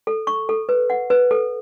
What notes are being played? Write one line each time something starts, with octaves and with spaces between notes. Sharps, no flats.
A4
C#6
A4
B4
F#5
B4
A4